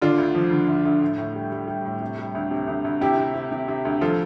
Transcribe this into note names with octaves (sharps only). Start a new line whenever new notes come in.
D3 D4 F4
D2
F3
D3
D2
D2
A2
A2
G3
G3
G3
A2
C3
G3
D2
C3
D2
D2
C3 E4 G4
C3
C3
C3
C3
D2
F3 F4 A4